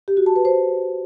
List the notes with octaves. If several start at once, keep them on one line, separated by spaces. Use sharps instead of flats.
G4
F#4
A5
B4
C5